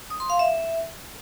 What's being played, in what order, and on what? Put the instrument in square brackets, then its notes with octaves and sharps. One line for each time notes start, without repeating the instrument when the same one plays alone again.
[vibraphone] D#6
C6
F5
E5